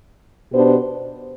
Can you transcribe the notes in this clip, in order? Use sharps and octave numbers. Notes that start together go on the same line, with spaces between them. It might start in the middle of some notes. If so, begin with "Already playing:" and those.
B2 B3 D4 G4 C5